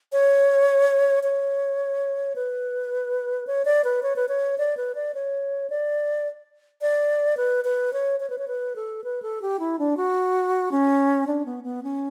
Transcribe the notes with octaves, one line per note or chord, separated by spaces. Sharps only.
C#5
C#5
B4
C#5
D5
B4
C#5
B4
C#5
D5
B4
D5
C#5
D5
D5
B4
B4
C#5
C#5
B4
C#5
B4
A4
B4
A4
G4
E4
D4
F#4
C#4
D4
B3
B3
C#4